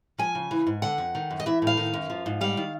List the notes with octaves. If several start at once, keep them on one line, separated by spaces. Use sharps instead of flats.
F3 G#5
C#3
E3
G#2
D3 F#5
F2
D#3
F#2
D#5
E3 E5
A2 F5
D#3
F#2
F3
G#2
G3 F5
D#3